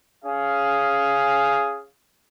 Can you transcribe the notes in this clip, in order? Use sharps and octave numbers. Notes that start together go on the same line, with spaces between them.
C#4 G#4 F5